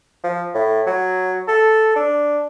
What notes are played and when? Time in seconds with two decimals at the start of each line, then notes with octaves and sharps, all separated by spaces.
0.24 F3
0.54 A2
0.86 F#3
1.48 A4
1.96 D4